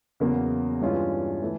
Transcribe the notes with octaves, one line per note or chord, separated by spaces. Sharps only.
E2 C#3 F#3 A#3
G2 E3 G#3 C#4 F4
E3 A3